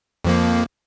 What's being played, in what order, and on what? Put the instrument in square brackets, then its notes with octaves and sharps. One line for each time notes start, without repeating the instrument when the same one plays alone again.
[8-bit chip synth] F2 F3 A#3